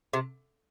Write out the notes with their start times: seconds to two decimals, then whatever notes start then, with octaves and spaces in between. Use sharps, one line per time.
0.13 C3